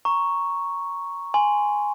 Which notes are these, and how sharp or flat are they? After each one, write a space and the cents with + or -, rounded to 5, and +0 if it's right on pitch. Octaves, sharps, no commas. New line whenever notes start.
A#5 +0 C#6 +0
G#5 +0 C6 -15